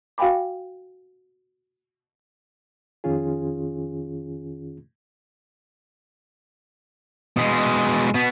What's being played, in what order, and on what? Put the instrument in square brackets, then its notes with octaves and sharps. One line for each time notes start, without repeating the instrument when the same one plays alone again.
[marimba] F#4 F5 G5 G#5 B5 D6
[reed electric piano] F2 D#3 C#4 F4 G#4
[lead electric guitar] B2 G#3
B2 B3